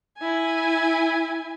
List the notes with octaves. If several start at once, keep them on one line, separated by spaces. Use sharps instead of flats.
E4 G#5